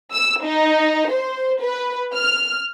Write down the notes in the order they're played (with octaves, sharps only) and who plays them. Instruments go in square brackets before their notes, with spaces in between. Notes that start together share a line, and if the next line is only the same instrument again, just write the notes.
[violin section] E6
D#4
C5
B4
F6